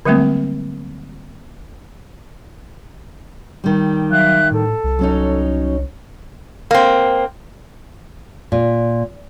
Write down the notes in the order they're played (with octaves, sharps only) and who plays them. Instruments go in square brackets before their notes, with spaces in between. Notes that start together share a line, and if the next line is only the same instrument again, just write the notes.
[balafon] D3 F#3 G3 A3 A#3 C4
[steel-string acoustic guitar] D#3 G3
[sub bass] F#3 [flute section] E5 F5 F#6
[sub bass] A2 [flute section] A4
[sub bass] C2
[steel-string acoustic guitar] F#3 C#4 D#4
[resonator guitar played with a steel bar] A#3 C4
[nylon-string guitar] A#2